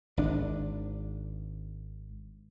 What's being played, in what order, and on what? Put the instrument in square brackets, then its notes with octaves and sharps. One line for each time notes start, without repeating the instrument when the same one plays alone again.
[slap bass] G#1 D4